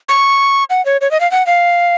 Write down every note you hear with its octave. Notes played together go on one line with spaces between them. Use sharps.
C#6
F#5
C#5
C#5
D#5
F5
F#5
F5